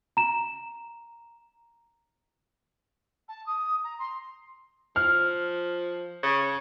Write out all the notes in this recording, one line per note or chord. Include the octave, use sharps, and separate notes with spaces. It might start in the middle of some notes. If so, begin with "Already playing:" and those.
A#5 E7
A5
D#6
A#5
C6
F3 F6
C#3